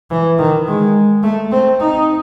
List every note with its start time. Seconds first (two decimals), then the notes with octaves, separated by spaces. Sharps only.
0.10 E3
0.38 D#3
0.67 G#3
1.23 A3
1.51 C4
1.80 D#4